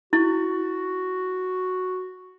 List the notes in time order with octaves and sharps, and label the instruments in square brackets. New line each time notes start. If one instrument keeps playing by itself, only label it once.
[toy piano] E4 [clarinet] F#4